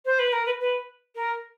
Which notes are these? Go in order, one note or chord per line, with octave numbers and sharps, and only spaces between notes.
C5
B4
A#4
B4
B4
A#4